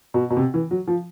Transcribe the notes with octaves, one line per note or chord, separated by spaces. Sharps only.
B2
B2
C3
E3
F#3
F3